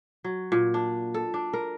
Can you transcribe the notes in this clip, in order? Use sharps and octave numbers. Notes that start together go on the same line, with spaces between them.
F#3
A#2
D4
A4
D4
A#4